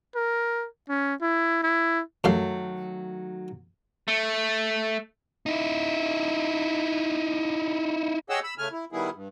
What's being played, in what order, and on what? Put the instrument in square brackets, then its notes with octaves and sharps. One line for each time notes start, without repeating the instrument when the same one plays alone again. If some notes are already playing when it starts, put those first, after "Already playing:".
[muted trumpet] A#4
C#4
E4
E4
[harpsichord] F#2 G4 F5 [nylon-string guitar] D#3 F#3 A3
[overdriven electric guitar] A3
[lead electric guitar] D#4 E4
[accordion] G4 G#4 C#5 D#5 F#5 E6
B5 E6
C#3 A3 G#5 F6
E4
D#3 G3 B3 E4 G#4
G2